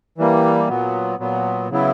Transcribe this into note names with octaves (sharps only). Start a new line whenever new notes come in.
E3 G3 A#3
A#2 F#3 B3
A#2 F#3 B3
C#3 F#3 B3 E4